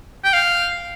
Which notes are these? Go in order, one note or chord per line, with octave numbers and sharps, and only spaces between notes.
G5
F5